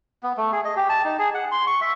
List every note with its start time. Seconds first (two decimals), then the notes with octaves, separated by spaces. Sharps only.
0.23 B3
0.37 A3
0.52 G#4
0.65 D#5
0.76 G4
0.89 A5
1.05 D#4
1.19 G#4
1.34 F#5
1.51 C6
1.67 C#6
1.81 E5